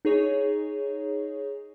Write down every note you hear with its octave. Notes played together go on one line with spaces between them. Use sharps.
D#4 G#4 C#5